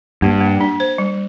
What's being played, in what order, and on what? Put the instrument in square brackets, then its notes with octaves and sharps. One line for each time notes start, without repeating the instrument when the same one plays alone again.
[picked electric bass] G2 [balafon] A#3
[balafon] A#3
D4
C5
G3